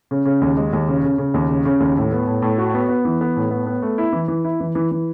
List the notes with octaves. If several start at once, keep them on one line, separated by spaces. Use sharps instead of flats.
C#3
C#3
D#2
G#3
D#2
C#3
C#3
C#3
D#2
C#3
C#3
D#2
A2
B3
A2
A2
F#4
B3
B3
E3
B3
A2
B3
B3
A3
E4
E3
E3
E4
E3
E3
E3